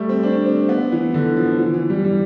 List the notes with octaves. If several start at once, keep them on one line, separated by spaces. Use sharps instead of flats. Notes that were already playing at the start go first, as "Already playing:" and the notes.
Already playing: G3 A3
C4
D4
C4
B3
E3
D3
F3
E3
E3
G3
G3